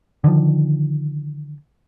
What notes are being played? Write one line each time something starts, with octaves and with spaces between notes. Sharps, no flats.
D3 D#3 F3